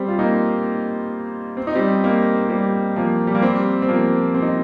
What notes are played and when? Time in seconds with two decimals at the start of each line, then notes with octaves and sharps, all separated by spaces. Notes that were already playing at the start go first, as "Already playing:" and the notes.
Already playing: G3 C4
0.08 F4
0.19 A#3 D#4
1.57 C4
1.67 D#4
1.75 G3 C4
2.04 A#3 D#4
2.49 G3 C4
2.96 F3 A#3
3.27 G3
3.35 A#3
3.42 G3 C4
3.82 C4
3.88 F3 A#3
4.34 C4
4.42 D#4